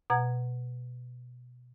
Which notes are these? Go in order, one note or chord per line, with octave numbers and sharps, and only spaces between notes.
B2 F#5 A#5 G#6